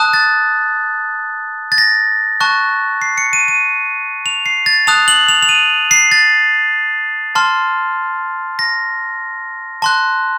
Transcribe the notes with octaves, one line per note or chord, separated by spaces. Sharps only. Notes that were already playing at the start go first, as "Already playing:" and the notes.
Already playing: A5 D#6 F#6
A6
A6
A#6
A5 C#6 F#6
C7
C#7
D#7
D#7
F7
C7
A6
A5 D#6 F#6 F7
F#7
F7
F7
D#7
C7
A6
A5 C6 F6
A#6
A5 C6 F#6